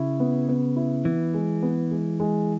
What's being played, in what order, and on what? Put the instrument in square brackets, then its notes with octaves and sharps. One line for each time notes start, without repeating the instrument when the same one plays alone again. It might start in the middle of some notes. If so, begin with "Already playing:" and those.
Already playing: [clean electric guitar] C#3 [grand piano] E4
[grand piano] B3
B3
E4
[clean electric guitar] E3 [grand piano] B3
[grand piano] G#3
B3
G#3
G#3